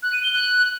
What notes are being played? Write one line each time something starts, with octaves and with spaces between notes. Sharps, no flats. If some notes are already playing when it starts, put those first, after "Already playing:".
F#6
D#7
G7
F#6